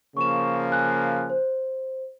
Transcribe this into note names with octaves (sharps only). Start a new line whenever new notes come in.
C#3 F3 A#3 C#6 E7
G#5 F#6
C5